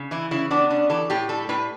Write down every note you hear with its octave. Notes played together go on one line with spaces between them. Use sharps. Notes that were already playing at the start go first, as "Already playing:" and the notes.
Already playing: C#3
E3 E4
C#3 E4
B3 D4
C#3 D4
E3 A4
A2 G4
G3 A4
A2 B4